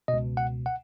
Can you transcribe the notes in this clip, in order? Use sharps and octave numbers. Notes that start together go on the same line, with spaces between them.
C#2 B2 D#5
F#5
F#5